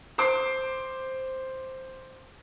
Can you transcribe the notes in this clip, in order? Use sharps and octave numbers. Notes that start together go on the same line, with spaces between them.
C5 D6 C7